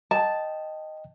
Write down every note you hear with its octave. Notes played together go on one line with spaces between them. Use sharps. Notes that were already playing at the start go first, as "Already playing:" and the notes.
D#5 G5 A5